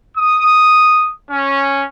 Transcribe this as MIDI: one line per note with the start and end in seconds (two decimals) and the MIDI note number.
0.16 1.10 87
1.29 1.82 61